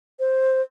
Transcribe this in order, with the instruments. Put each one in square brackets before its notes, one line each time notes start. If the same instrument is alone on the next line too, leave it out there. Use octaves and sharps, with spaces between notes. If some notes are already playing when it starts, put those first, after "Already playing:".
[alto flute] C5